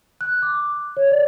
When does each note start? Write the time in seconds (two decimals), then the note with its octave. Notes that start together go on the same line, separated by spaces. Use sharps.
0.21 F#6
0.42 D6
0.97 C#5
1.11 D5